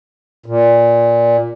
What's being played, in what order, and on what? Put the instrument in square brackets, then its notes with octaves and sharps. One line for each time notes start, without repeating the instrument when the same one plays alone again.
[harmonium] A#2